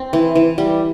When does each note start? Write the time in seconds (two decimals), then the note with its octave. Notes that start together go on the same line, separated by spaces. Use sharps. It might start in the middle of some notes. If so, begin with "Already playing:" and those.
Already playing: C4
0.13 E3
0.35 E3
0.58 G3